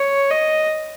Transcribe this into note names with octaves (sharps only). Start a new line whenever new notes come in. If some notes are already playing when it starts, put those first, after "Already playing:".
Already playing: C#5
D#5